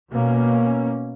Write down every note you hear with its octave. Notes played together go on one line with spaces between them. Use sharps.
B2 A#3 C#4